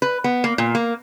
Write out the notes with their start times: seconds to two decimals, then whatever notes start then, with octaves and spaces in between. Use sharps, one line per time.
0.02 B4
0.24 B3
0.44 A#3
0.58 A#2
0.75 A#3